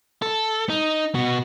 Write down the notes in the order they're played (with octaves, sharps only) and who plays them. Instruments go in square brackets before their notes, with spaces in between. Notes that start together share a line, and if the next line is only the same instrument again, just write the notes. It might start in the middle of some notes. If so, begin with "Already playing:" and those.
[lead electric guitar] A4
D#4
B2 F#4